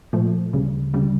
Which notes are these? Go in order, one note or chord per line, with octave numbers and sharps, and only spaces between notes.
A#2 F3 A3
D2 C#3 G3
D2 C#3 G3